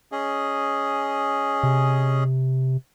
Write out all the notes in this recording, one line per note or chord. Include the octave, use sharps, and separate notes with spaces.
C#4 G#4 D#5
C3